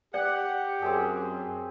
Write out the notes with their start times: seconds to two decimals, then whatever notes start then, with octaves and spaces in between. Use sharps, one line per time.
0.14 G4 D5 F#5
0.82 F#2 C4 G#4